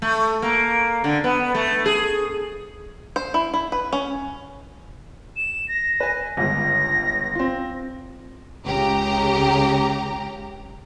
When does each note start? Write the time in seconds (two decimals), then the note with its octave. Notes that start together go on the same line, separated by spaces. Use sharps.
0.02 A3
0.42 A#3
1.04 D3
1.24 B3
1.55 A3
1.86 G#4
3.16 C5
3.34 E4
3.54 E4
3.72 B4
3.93 C#4
5.36 E7
5.68 A#6
6.00 B4 G#5
6.37 G1 C#2 A#6
7.35 C4 F4
8.66 C#2 C#3 G4 A#5